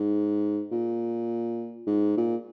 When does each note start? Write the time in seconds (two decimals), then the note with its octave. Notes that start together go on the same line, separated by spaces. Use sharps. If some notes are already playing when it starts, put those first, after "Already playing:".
Already playing: G#2
0.71 A#2
1.87 G#2
2.17 A#2